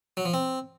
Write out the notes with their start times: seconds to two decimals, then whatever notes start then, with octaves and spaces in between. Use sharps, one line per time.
0.17 F#3
0.25 F3
0.34 C4